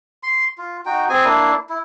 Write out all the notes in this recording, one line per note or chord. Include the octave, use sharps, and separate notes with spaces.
C6
F4
D#4 F#4 G5
C4 G#4 G#5
A#3 D4 E4
E4